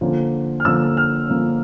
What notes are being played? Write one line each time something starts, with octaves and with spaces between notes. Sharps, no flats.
D3 F3 A#3 C#4
F6
D3 F3 A#3 C#4 E6
F6
D3 F3 A#3 C#4